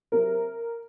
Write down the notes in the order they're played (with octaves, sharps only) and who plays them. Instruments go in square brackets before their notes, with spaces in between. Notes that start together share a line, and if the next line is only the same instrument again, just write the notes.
[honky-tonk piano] C3 F#3 A#4